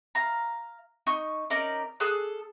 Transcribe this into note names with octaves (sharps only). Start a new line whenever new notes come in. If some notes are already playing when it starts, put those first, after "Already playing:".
F5 A#5
D#4 C#6 G6
C#4 D#4 A#4 D5
G#4 A4 F6 F#6